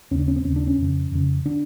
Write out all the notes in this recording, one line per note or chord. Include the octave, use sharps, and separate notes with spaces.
D#2 C#3 C#4
D4
C#4
C4
D#2 C#3 C#4
D4
C#4
F2 C#3
F2 C#3
D3 D4